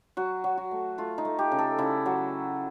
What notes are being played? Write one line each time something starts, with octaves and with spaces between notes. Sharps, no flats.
F#3 F#4
F#3
F#4
A3
A3 F4
D#4
A3
G4
C#3
A4
C#3 E4
F#3